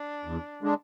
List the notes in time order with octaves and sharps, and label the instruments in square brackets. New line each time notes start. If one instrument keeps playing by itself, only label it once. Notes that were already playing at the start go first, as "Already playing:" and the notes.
Already playing: [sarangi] D4
[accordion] E2
D3 G#3 D4